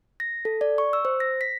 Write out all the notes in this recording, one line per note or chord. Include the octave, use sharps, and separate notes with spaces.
A#6
A4
D5
C#6
E6
C5
A#6
B6